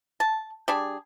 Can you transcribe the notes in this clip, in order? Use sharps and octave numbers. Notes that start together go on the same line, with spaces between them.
A5
G3 D4 G#4